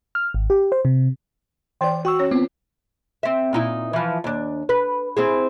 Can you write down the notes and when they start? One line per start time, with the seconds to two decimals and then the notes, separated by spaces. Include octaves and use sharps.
0.15 F6
0.34 G#1
0.50 G4
0.72 C5
0.85 C3
1.81 E3 C5 D5 G5
2.05 F#4 G5 C#6 E6
2.19 C#4 C#5
2.31 B3 C4 F4
3.23 C4 E5
3.53 A#2 D#4 E4
3.93 E3 F3
4.24 D#2 D4
4.69 B4
5.17 C4 E4 G#4